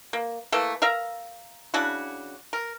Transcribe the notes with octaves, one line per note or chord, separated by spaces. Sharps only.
A#3
E3 A3 A#3 A4
A#4 E5 F5 A#5
C#3 D4 E4 F#4
A#4